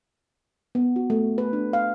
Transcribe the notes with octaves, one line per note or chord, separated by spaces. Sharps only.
B3
F#4
A3
B4
D4
F5